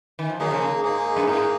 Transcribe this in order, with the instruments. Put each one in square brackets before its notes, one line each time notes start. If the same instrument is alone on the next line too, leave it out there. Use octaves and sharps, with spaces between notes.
[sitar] D#3
F3
[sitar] D#3 F#3 [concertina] A#3 D#4 G#4
[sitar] C#3 F3
C#3
[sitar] G#2 [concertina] A#3 D#4 G#4
[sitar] F#2
[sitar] G#2 [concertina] A#3 D#4 G#4